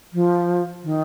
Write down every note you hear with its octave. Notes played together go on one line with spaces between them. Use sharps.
F3
D#3